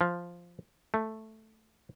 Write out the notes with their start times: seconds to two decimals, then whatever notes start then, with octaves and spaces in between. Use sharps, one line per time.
0.01 F3
0.94 A3